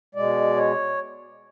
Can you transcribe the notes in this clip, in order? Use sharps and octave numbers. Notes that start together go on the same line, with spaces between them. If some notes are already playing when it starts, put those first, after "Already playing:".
B2 G#3 D5
C#5